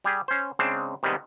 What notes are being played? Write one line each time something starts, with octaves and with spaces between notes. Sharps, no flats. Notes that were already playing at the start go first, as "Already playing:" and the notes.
G3 G4 G#4
C#4 C5
C#3 G#3 C4 D4
C3 D#3 G3 G#3 B3